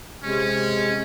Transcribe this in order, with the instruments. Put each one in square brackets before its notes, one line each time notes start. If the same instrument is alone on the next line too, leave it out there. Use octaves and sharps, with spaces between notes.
[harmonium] C3 G#3 [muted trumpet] C#4